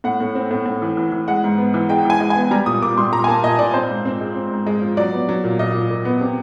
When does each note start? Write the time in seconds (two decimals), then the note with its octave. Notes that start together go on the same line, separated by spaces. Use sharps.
0.04 A2 F#5
0.20 A2
0.35 C4
0.51 A2
0.66 A2
0.82 E3
0.97 E3
1.12 E3
1.28 G#3 F#5
1.44 G#2
1.58 B3
1.74 E3
1.89 G#3 G5
2.05 E3 G#5
2.20 G#3
2.30 G#5
2.36 B3
2.51 G3 A#5
2.66 A#2 D#6
2.82 A#2 D6
2.97 G3 C6
3.12 A#2 A#5
3.24 G#5
3.28 A#3 A5
3.43 A#2 D#5
3.59 A#2 D5
3.74 C4 C5
3.89 G#2
4.05 C4
4.21 G#3
4.36 C4
4.51 G#2
4.66 G#3
4.82 F3
4.97 F#3 D5
5.12 B3
5.29 F#3
5.44 A#2
5.59 A#2 D#5
5.74 A#2
5.90 A#2
6.05 B3
6.21 C3